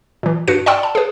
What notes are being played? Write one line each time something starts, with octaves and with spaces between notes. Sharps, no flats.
A#2 E3
G2 F#4 B4 C#7
D5 F#5 G5 C6 E6
A5
G#4 B4